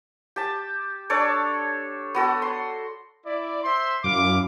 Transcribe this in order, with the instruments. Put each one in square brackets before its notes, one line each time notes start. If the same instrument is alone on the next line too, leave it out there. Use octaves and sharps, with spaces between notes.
[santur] G4 A5
D4 A4 C#5 D5
B3 F#4 A4
C6
[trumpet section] E4 D5
C5 E5 C6
[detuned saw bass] F#2 [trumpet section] E4 F5 D6